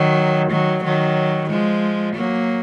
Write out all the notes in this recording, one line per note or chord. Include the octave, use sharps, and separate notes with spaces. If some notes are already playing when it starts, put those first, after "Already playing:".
Already playing: D#3 F#3
D#3 F#3
D#3 F#3
F3 G#3
F#3 A#3